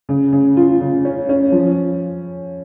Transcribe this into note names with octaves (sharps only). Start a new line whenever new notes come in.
C#3
C#3
F4
C#3
C#4
C#4
F3